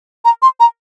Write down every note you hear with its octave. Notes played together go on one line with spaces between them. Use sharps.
A#5
C6
A#5